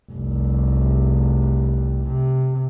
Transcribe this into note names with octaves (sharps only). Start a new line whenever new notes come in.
F1 C2
C3